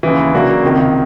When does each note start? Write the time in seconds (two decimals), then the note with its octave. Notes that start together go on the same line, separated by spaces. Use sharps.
0.03 D#2 C#3 E3
0.33 C#3 F#3 A#3 D4 F#4
0.63 C#2 C3 D#3